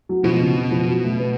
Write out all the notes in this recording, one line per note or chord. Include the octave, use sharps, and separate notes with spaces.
F#3
B2 F3
C#3
C#3
F3
F#3
A3
B3